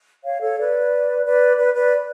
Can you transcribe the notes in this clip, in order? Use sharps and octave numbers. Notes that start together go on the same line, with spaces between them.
C#5 F5
A4 C#5
B4 D5
B4 D5
B4
B4 D5